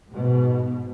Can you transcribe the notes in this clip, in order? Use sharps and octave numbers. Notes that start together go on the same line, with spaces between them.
G#2 B2